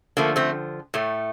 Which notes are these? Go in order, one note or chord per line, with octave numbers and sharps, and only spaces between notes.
D3 F3 A3 A#3
A3 C4
A2 A3